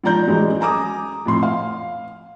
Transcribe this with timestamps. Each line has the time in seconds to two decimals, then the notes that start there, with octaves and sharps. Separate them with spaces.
0.03 A#1 G#2 D5 A#5 G6
0.27 A1 F#2 G#3
0.61 G#5 A#5 D6 D#6
1.26 F2 A2 C6
1.43 F5